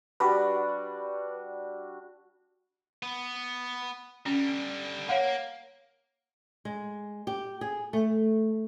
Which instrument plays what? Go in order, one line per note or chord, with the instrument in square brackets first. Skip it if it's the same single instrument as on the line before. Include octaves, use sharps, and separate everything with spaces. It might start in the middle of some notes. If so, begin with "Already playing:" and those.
[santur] G3 D4 F#4 [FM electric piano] B4
[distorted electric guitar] B3
[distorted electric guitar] D3 G3 [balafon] C#4
[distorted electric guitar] A#3 [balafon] C#5 F5 F#5
[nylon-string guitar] G#3
G4
G#4
A3